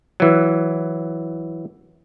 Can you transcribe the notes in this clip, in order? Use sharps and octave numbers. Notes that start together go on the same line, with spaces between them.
E3 F#3